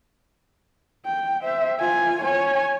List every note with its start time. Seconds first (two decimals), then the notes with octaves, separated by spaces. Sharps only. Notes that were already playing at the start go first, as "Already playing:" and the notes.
1.05 G5
1.43 C5 E5
1.79 F4 G#5
2.22 C#5 G#5